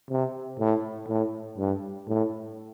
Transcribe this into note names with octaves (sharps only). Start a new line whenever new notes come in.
C3
A2
A2
G2
A2